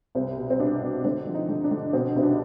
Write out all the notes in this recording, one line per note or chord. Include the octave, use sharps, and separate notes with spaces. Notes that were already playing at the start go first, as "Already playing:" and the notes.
C2 C4
B2
C4
B2 D4
C2
D3 C4
F3
D#4
D3
D4
D3
B2 C4
C2 C4
D4